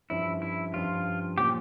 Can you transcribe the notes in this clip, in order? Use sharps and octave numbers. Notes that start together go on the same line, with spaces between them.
G2 F3 C#4 E4
E4
G2 F3 C#4 F4
A#2 F3 C#4 G4